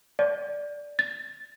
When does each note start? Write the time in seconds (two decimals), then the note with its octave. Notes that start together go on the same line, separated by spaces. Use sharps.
0.19 D5
0.99 A6